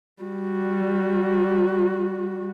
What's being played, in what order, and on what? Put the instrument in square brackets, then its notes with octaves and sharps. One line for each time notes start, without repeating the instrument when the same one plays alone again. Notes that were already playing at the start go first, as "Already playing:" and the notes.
[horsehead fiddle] G3 F#4